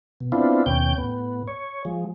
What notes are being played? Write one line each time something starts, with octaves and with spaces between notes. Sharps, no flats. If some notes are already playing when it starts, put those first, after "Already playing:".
B2
B3 C4 D4 E4 F4
D#2 B2 C#4 G5 G6
A2 B3
C#5
F3 G#3